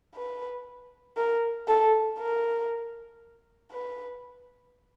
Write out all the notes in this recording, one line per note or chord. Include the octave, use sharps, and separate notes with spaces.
B4
A#4
A4
A#4
B4